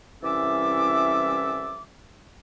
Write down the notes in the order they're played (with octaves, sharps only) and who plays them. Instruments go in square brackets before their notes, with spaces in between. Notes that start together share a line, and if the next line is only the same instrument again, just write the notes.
[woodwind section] C2 E3 C#4 A4 E5 D6